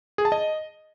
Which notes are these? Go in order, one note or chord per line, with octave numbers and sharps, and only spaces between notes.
G#4
A5
D#5